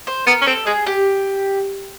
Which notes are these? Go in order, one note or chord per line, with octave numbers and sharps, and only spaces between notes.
C5
B3 A#4
C#4
C4 A4
G#3 G#4
G4